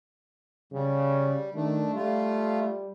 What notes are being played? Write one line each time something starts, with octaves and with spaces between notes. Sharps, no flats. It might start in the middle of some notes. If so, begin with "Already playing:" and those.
C#3 G3
D#3 A3 D4
G3 A3 F4